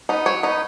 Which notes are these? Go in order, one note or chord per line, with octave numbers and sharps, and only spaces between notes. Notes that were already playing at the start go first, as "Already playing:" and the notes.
B3 D#4
F#3 C#5
B3 D#4